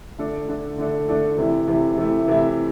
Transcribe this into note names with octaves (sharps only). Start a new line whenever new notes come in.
D3 A3 D4 A4
D3 A3 D4 A4
D3 A3 D4 A4
D3 A3 D4 A4
C3 E3 A3 E4
C3 E3 A3 E4
C3 E3 A3 E4
C3 E3 A3 E4